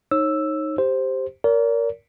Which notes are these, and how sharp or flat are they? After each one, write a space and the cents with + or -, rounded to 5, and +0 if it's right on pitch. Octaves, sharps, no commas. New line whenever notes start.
D#4 -5 C#5 -30 E6 +0
G4 +0 C5 +0
A#4 +0 D5 -45